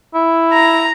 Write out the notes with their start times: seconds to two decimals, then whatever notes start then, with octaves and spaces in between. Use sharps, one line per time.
0.15 E4
0.53 A#5